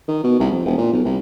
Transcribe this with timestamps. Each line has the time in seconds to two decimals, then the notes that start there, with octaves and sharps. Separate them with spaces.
0.08 D#3
0.24 B2
0.39 C2
0.51 F2
0.65 E1
0.78 A#2
0.93 B1
1.04 C2